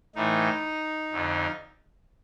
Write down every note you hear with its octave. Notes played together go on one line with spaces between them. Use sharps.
A2 E3 D#4
F2 D3 F3